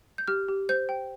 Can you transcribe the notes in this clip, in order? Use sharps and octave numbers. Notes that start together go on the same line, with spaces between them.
G6
G4 F6
G4
C5 G6
G5